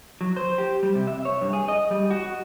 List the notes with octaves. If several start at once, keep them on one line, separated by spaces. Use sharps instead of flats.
F#3
C5
G4
G3
C3
E5
C#5
G2
G#4
D#5
G3
F#4